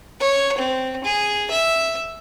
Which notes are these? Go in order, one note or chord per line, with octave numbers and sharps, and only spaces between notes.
C#5
C4
G#4
E5